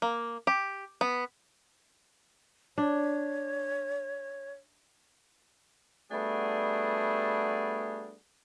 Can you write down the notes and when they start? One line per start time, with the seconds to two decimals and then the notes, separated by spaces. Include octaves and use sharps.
0.02 A#3
0.47 G4
1.01 B3
2.78 D4 C#5
6.11 G3 A3 B3 D4 F#4 G#4